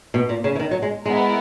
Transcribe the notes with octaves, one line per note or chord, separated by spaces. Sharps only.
B2
A#2
C#3
E3
D#3
F#3
G#3
G#3 B3 E4 A#4